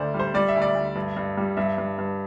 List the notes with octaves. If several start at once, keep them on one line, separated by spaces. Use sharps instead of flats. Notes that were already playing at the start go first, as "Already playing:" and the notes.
Already playing: D2 D3 C5 D5
G3
C5
G3 D5
E5
D2
D5
D2
G2
G2
G3
G2 E5
G2
G2